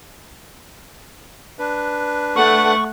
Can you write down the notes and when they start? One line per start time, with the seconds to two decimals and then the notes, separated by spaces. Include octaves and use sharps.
1.59 D4 B4
2.36 A3 F#5 C#6